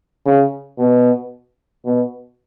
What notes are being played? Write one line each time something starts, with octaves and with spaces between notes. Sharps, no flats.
C#3
B2
B2